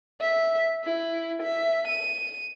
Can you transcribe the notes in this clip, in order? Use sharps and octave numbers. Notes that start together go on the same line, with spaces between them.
E5
E4
E5
D#7